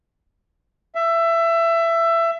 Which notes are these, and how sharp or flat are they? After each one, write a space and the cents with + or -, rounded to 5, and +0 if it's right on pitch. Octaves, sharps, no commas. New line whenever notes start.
E5 +20